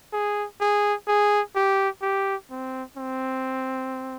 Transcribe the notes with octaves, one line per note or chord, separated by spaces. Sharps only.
G#4
G#4
G#4
G4
G4
C4
C4